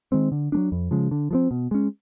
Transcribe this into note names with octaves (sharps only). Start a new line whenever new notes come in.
D#3 G#3 C4
D3
F#3 A3 D4
F2
C#3 F3 G#3
D3
F3 G#3 C4
B2
G#3 C#4